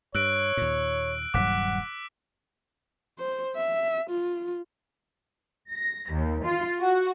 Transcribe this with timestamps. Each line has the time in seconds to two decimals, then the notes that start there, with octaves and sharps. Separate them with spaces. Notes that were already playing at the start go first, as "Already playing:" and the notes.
0.15 G2 C#5 E6 F#6 D7
0.57 D#2 A#2
1.34 D#1 G2 F#3 F#5 D6 F#6 B6
3.19 C5
3.56 E5
4.10 F4
5.69 A#6
6.11 D#2
6.45 F4
6.80 F#4